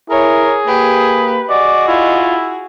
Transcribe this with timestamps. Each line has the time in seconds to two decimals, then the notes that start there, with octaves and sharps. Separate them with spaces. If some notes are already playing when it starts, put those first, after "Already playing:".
0.10 E4 G#4 A#4 C#5
0.67 A#3 G4 B4
1.50 F#4 G#4 D5 D#5
1.88 E4 F4